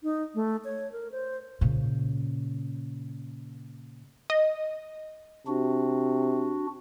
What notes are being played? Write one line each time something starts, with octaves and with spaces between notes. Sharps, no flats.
D#4
A3
C#5
A#4
C5
A#2 C#3
D#5
C3 D4 F#4